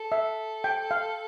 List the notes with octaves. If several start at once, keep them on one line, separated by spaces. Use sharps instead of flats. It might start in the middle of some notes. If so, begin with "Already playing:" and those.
Already playing: A4
E5
G5
F5